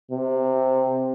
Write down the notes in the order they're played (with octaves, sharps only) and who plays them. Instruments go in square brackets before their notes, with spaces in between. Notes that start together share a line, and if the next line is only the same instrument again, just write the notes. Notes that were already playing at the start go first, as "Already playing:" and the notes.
[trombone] C3